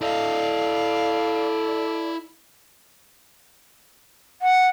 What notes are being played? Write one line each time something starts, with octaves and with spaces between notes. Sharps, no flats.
E4 A4 D5 D#5 F5
F#5